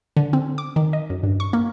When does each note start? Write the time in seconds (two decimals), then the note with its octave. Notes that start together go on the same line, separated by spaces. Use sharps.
0.17 D3
0.33 C4
0.58 D6
0.76 D#3
0.93 D#5
1.10 F#2
1.23 G2
1.40 C#6
1.53 A#3